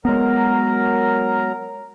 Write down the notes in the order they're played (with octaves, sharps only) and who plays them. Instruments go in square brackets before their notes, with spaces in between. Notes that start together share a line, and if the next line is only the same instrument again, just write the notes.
[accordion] F#3 A#4 A#5 [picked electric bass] G#3 B3